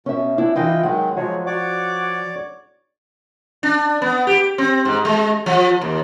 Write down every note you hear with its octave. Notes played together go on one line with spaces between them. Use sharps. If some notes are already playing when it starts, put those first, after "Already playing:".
B2 C#4 E5
D4 E4
E3 E4 F4 D#5 G5
D#3 F#3 G#3 F#5
F3 F#3 G#3 C#5
F#4 C#5 D5 D6
D4
B3
G4
C4
G#2
G#3
F3
D#2